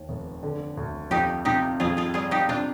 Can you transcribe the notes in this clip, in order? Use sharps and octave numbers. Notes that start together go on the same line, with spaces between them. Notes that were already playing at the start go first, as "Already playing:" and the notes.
Already playing: D#2
F1
D3
D2
F2 D#4 G4
C3 D#4 G4
F2 F4 G#4
F4 G#4
G3 F4 G#4
D#4 G4
C3 D4 F4